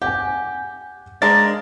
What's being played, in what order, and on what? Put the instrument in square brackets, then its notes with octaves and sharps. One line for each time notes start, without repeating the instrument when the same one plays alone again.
[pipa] G4 [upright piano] F#5 G#5
[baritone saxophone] G#3 [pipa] A#3 D4 A#4 [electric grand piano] A6